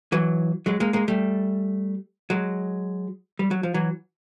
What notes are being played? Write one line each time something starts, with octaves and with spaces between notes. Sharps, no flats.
E3 F#3
F#3 G#3
G#3 A#3
G#3 A#3
G3 A3
F#3 G#3
G3
F#3
F3
E3 F#3